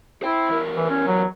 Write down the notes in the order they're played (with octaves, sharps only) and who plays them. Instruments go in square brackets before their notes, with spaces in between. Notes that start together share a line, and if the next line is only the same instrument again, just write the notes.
[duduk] E4 [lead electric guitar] C5 G5
[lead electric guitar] E2 A#4
[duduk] E3
C#4
F#3